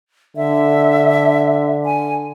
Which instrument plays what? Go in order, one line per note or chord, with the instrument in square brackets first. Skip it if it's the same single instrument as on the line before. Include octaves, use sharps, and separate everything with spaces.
[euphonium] D3 [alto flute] E5
[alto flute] G#5